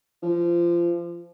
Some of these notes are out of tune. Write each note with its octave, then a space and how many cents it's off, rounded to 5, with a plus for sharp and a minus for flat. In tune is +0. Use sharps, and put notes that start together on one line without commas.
F3 -25